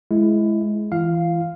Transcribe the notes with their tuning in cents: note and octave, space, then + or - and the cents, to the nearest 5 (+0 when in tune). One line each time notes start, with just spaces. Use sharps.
G#3 +25 E4 +15
E3 +0 F4 -45 F5 +0